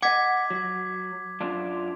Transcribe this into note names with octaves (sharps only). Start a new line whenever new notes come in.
D#5 F#5 D6 G#6 B6
F#3
F#2 D4 F4